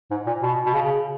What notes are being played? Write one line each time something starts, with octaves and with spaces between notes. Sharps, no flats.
G#2
A#2
B2
B2
C#3